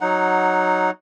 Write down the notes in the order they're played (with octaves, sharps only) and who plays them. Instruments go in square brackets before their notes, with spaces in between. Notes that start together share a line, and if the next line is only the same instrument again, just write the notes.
[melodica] F#3 D#4 F#5